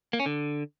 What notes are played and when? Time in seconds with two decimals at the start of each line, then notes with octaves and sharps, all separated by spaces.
0.13 A#3
0.20 C#4
0.26 D3